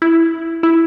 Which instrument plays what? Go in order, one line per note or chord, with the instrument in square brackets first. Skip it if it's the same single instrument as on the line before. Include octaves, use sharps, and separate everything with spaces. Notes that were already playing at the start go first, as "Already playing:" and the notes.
[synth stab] E4
E4